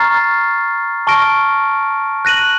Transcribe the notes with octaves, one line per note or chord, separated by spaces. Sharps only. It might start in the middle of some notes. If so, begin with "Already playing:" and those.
Already playing: A#5 C#6 F6 A6 C7
A5 C#6 F6 A#6 D7
F#6 A#6 D#7 F#7